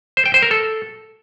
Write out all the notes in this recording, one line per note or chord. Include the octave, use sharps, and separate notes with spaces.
C5
G5
C5
A#4
A4